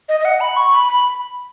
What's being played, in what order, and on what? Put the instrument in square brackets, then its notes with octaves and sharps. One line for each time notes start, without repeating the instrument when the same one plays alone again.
[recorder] D#5
D#5
F#5
B5
C#6
B5
B5